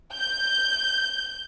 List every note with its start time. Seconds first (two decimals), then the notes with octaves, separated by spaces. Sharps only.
0.14 G6